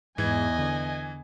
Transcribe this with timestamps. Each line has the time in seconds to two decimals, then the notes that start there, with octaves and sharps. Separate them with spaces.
0.18 E2 G#2 E3 D#5 G#5 G#6
0.59 D3